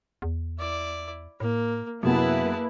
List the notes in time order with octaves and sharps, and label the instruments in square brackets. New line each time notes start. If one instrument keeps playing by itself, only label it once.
[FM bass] E2
[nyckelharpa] E4 D5
[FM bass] A2 [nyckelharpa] A#3
[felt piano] F#2 B3 [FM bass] C3 [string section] A#3 E4 B4 [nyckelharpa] G#4 A5